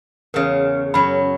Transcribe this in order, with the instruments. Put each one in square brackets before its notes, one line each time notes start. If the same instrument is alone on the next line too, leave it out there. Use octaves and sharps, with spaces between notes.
[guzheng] E2 C#3 [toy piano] A#4 D#6
[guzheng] F#2 F#3 [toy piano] B5